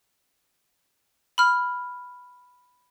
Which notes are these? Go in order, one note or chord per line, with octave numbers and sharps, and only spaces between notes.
B5 F6